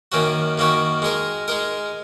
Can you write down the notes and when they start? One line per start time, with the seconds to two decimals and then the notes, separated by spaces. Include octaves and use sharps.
0.12 F#2 D#3 A#3 C#4 F#4
0.58 F#2 D#3 A#3 C#4 F#4
1.02 G#3 D#4 A#4
1.48 G#3 D#4 A#4